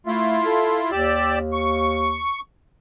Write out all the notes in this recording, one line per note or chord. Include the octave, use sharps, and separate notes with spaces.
A3 E4 F4
A4
D#2 G4 D5 E6
C#6